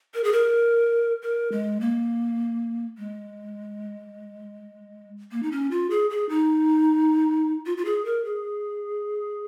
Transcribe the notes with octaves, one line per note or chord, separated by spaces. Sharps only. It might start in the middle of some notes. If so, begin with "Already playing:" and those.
A#4
G#4
A#4
A#4
G#3
A#3
G#3
A#3
D#4
C#4
F4
G#4
G#4
D#4
F4
F4
G#4
A#4
G#4